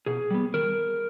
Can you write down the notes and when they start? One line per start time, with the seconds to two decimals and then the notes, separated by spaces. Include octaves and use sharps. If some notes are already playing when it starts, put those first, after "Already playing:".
0.06 B2 G#4
0.31 G3 B3
0.54 D#3 A#4